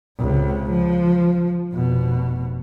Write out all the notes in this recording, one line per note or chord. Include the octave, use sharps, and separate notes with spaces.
C#2 C3
F3
F1 B2